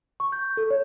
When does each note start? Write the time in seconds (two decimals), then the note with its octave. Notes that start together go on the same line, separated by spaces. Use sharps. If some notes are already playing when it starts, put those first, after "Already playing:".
0.20 C#6
0.32 G6
0.57 A4
0.71 C#5